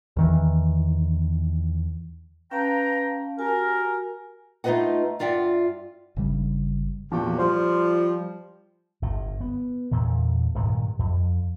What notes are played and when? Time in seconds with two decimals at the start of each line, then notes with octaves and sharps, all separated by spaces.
0.17 E2 D#3 E3
2.51 C#4 B4 F5 G5 A5 A#5
3.39 F#4 G4 A#4 G#5
4.64 A3 D#4 F4 B4 D#5 F#5
5.19 G2 F4 D5 E5 F#5 G5
6.16 G1 C#3 G3
7.12 E2 A#2 F3 F#4 G4
7.38 F3 G3 C5
9.02 G1 A2
9.41 B3
9.91 E2 A#2 D3
10.55 G2 A#2 D#3 F#3
10.99 F2